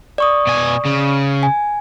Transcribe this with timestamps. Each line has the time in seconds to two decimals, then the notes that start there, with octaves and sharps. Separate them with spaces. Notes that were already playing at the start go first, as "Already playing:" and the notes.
0.18 D5 C#6 D#6
0.47 B2 G#5
0.86 C#3
1.43 G#5